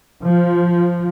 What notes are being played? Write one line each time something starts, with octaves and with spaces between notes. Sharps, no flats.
F3